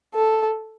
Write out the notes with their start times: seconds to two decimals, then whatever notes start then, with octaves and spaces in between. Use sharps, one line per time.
0.14 A4